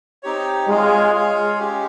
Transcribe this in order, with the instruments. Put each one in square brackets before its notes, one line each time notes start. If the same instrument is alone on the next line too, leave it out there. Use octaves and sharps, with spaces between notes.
[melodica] C4 D#4 G4 C#5
[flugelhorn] G#3 [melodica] F4 G#4 C#5 F5
[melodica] F4 G#4 C#5 F5
G#3 C#4 G4